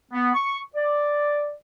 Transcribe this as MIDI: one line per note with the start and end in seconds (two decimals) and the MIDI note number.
0.12 0.29 59
0.34 0.59 85
0.75 1.54 74